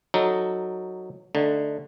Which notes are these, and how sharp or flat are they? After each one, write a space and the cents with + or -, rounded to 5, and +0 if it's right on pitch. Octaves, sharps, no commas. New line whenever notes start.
F#3 +0 D#4 +0 A4 +10
D3 +0 A3 +0 D#4 -15